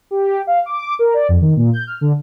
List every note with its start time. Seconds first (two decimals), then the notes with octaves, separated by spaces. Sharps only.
0.11 G4
0.47 F5
0.66 D6
0.99 A#4
1.14 D5
1.29 F2
1.41 D#3
1.56 A#2
1.73 G6
1.87 F6
2.01 D3